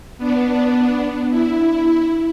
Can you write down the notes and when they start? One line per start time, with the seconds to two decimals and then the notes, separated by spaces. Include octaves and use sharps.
0.18 B3 D4
1.30 E4